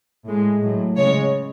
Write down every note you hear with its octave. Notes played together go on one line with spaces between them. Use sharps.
A2 G#3
A2 F#3
C#3 G#3 C#5